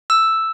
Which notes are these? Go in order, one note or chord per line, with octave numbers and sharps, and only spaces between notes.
E6